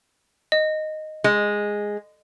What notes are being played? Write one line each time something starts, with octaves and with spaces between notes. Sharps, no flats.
D#5
G#3